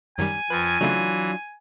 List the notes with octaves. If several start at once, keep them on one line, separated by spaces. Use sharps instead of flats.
F#2 D#3 G3 G#5
F2 F3 B4 G#6
C#3 E3 F#3 A3 D4 D#4 F4